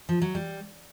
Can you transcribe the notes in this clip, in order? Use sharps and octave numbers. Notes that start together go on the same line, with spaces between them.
F3
F#3
G3